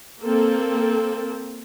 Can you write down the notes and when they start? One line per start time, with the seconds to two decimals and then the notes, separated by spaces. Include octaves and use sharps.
0.23 A#3 C4 A4